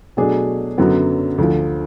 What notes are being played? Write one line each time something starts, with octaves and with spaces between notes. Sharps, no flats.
B2 F#3 A3 D4 G#4
F#2 D3 F#3 B3
D2 D3 F3